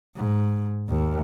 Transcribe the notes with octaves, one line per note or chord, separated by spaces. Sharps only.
G#2
D#2